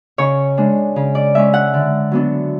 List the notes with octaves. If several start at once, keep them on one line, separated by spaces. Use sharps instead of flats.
C#3 C#5
G#3 D4
C#3
D5
G#3 C#4 E5
F#5
D3
F#3 B3 D4